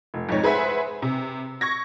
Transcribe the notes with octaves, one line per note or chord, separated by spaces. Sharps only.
F1
F2 G#2 C#5
G#4 B4 C5 E5 F#5 G#5
C3
C#6 G#6 A#6